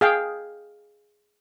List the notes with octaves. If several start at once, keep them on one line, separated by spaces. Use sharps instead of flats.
G#4 F5 G5